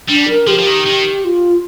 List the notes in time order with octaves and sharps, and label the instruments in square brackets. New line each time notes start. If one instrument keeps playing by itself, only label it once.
[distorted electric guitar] G3 [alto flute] D4
[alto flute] A#4
[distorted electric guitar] F3 [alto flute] G4
[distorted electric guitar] F3
D#3
D#3
[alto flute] F4